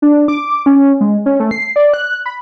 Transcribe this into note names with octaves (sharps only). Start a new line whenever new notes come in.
D4
D6
C#4
G#3
C#4
A3
C7
D5
F#6
B5